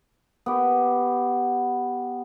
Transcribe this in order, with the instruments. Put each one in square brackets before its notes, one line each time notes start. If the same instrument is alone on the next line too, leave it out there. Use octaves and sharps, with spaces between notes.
[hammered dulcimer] B3 G4